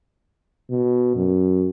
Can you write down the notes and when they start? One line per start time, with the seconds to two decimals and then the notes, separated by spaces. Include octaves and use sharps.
0.70 B2
1.16 F#2